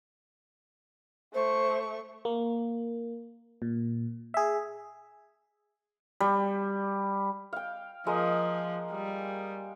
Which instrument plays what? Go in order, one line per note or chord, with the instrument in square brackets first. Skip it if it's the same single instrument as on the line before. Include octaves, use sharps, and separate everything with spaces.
[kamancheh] A3 C#6 [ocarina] C5
[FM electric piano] A#3
A#2
G#4 E5
[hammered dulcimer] G3
[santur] F5 G5
[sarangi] F3 [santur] G#3 A#3 D#5
[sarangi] G3